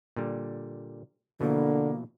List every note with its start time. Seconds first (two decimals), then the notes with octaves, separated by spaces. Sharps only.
0.16 A#2 D3 G3
1.41 B2 D3 E3 F3 A#3